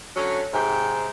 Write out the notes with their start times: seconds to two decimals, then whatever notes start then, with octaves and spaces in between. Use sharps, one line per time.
0.16 D3 F#3 C#4
0.53 G#2 C3 G5